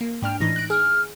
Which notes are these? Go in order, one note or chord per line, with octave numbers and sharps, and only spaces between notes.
A#3
G#2 D4 G5 F6
A2 E3 D#4 A#6
F#6 D7
G#4 F6